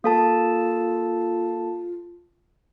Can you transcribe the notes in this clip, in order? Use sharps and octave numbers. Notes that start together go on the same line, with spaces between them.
A#3 F4 A4 A5